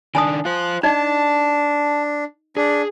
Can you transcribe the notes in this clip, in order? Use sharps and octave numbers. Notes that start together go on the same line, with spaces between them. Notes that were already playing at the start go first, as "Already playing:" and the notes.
D#3 D4 G#5 A5 D#6
F4 C5 F#6
D4 D#4 D#5 A5
D4 G#4